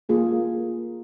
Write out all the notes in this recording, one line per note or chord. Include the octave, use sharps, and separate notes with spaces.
A#3 F4 G#4 A4